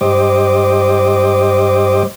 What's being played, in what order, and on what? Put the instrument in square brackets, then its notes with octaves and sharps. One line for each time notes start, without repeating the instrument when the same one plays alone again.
[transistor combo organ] G2 G3 C5 D#5 D6